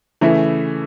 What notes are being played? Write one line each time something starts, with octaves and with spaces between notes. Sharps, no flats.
C#3 E3 A3 E4